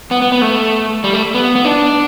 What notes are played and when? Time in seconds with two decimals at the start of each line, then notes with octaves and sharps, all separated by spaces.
0.11 B3
0.22 B3
0.32 B3
0.42 A3
1.04 G3
1.14 A3
1.34 B3
1.55 B3
1.65 D4